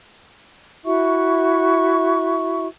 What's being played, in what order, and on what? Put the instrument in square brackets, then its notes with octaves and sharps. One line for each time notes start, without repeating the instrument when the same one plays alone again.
[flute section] E4 F#4 E5 C#6